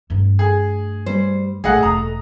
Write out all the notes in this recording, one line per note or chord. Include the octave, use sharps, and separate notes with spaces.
G2 A3
G#4
G3 C5
A#1 A3 G#4 D#5 F#5
E1 A#5 D#6